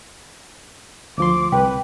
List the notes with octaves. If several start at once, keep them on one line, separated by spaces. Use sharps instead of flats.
D2 F3 C6 D6
C2 B4 G5